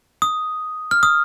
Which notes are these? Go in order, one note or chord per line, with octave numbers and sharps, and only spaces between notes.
D#6
F6
D#6